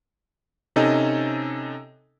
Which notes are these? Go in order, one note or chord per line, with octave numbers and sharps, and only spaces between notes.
C3 C#4 D#4 A4 D#5 G#5